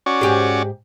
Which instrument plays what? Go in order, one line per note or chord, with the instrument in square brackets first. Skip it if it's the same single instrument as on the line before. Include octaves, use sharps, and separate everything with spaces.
[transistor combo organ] C#4 F#4 D5
[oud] G#2 G4 G#4